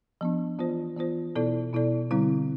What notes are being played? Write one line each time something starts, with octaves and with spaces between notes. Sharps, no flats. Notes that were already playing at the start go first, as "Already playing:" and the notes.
F3 B3 D4
E3 B3 F4 C5
E3 B3 F4 C5
B2 B3 E4 A4 D5
B2 B3 E4 A4 D5
D3 G3 C4 E4